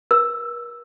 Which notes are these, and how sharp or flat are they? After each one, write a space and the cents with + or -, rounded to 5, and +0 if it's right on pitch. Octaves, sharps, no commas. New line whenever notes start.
A#4 +40 E6 +0